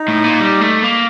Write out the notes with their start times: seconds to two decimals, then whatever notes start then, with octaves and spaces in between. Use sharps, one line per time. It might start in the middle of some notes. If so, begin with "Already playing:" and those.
Already playing: D#4
0.08 A2
0.24 A#2
0.40 G3
0.61 A3
0.82 A#3